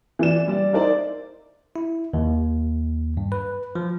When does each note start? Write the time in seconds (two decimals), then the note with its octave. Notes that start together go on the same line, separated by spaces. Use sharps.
0.19 E3 D5 E7
0.48 G3 D5
0.73 D#4 E4 A#4 C5 D5
1.76 E4
2.14 D#2
3.17 G2
3.32 B4
3.75 F3